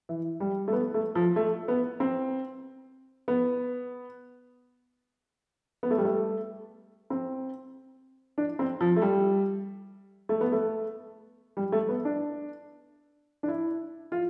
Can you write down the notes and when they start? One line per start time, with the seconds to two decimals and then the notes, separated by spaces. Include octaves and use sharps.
0.09 E3
0.40 G3
0.68 A3
0.73 B3
0.94 A3
1.15 F3
1.36 A3
1.68 B3
2.00 C4
3.28 B3
5.83 B3
5.91 A3
5.98 G3
6.05 A3
7.10 C4
8.38 D4
8.59 C4
8.81 F3
8.96 A3
9.02 G3
10.29 A3
10.41 B3
10.52 A3
11.57 G3
11.72 A3
11.89 B3
12.05 D4
13.43 D4
13.48 E4
14.12 F4